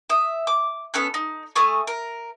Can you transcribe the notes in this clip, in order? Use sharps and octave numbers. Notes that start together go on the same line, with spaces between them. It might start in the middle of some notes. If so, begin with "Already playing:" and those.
E5 D#6
D6
B3 C#4 A4 F#6
D#4
A3 G#5 C#6 D#6
A#4